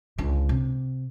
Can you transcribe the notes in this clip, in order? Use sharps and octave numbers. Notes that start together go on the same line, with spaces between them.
C#2 D3
C3